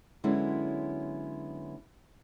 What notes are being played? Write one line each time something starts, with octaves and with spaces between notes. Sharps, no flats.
D3 F#3 G#3 B3 C#4 E4